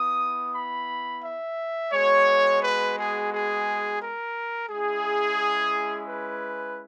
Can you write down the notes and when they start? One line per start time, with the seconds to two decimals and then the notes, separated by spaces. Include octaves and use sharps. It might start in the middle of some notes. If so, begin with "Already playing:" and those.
Already playing: B3 E4 D#6
0.54 B5
1.23 E5
1.92 G#3 B3 F#4 C#5
2.62 B4
2.97 G#4
3.32 G#4
4.00 A#4
4.69 G#3 C#4 E4 G#4
6.08 B4